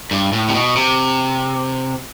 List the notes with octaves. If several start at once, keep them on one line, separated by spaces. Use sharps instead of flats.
G2
A2
C3
B2
C3